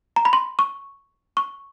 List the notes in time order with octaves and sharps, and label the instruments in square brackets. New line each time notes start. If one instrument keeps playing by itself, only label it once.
[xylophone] A#5
B5
C6
C#6
C#6